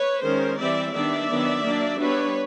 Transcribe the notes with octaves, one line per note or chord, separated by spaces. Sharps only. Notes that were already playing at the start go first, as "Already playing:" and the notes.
Already playing: B4 C#5
D#3 G#3 C#4 A#4 C5
E3 G3 C4 D5 E5
D#3 G3 B3 D4 D5 E5
D#3 F#3 B3 D4
F#3 A#3 D4
G3 B3 D4 B4 C#5